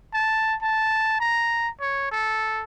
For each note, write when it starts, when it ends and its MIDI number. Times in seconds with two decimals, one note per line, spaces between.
0.14 0.55 81
0.62 1.19 81
1.20 1.69 82
1.81 2.09 73
2.12 2.63 69